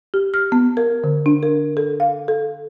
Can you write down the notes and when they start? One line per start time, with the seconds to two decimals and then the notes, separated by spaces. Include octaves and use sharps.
0.14 G4
0.34 F6
0.52 B3
0.77 A#4
1.04 D3
1.26 D4
1.43 A#4
1.77 A4
2.00 F5
2.28 A4